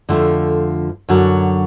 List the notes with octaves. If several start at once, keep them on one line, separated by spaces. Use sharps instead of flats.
F2 D3 F3 A3
F#2 D3 F#3